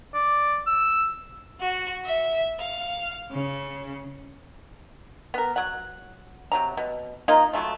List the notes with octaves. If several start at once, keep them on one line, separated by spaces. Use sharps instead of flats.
D5
E6
F#4
E5
F5
C#3
B3 A#4
F#3 F#5
C3 F#3 A#5
B2
A#3 D#4 F4 D#5
F#3 G#3 A3 F4